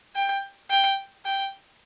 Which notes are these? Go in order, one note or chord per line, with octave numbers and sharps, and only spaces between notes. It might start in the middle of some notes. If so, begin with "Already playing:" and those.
G5
G5
G5